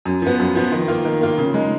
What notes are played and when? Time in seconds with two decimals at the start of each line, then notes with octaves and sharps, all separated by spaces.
0.05 F#2
0.22 F3 B3
0.40 F#2
0.55 F3 B3
0.72 D#3
0.88 A#3 F4
1.05 D#3
1.21 A#3 F4
1.38 C#3
1.54 G#3 D#4